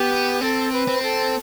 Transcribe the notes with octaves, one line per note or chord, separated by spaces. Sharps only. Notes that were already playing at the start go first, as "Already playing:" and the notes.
Already playing: B3 G4
C4 A4
B4
C4
A4